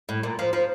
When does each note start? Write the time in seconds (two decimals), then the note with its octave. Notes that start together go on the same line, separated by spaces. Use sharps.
0.09 A2
0.23 A#2
0.39 F3
0.53 F3